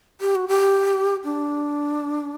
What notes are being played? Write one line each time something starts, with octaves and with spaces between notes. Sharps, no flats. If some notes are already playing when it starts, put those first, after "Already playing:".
G4
F#4
G4
D4